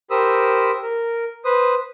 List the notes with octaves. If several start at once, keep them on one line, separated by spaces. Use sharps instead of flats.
G4 A#4 C5 B5 D#6 E6
A#4
B4 C5 D#6